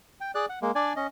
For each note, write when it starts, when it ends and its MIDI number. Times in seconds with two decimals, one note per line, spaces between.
0.20 0.31 79
0.35 0.46 68
0.35 0.46 74
0.35 0.46 90
0.50 0.59 78
0.62 0.71 56
0.62 0.71 58
0.75 0.93 62
0.75 0.93 74
0.75 0.93 80
0.96 1.07 61
0.96 1.07 75